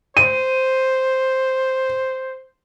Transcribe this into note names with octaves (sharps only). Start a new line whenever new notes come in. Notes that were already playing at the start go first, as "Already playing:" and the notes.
C5 D#7